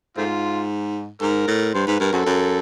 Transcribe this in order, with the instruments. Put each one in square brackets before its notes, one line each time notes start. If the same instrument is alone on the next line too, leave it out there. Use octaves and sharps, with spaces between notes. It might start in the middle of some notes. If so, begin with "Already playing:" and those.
[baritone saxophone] G#2 [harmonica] A3 C4 F4
[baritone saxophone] G#2 [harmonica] A#4
[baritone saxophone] A2
[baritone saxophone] G2 [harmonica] C5
[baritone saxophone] G#2 [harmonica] B4
[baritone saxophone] G2 [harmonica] A#4
[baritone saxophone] F#2 [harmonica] C4 F#4 A4
[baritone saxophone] F#2